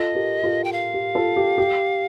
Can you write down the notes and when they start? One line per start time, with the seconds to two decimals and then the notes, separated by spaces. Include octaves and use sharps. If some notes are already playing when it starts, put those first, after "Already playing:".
Already playing: F4 A4 D#5
0.14 G4 A#4
0.43 F4 A4
0.64 G5
0.72 F5
0.94 G4
1.15 F4 A4
1.36 G4
1.58 G4